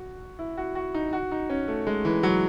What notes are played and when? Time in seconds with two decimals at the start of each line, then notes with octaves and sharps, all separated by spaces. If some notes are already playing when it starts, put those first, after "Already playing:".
Already playing: F#4
0.39 E4
0.58 F#4
0.75 F#4
0.94 D#4
1.13 F#4
1.31 D#4
1.50 C#4
1.68 A3
1.87 G#3
2.05 E3
2.23 F#3